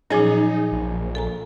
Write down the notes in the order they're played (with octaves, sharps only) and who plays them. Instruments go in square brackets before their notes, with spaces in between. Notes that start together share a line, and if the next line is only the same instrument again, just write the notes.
[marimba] A#2 F3 F#3 [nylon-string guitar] C#4 G#4 [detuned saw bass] D#4
[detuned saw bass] A#1
[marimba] A4 G#5 A#5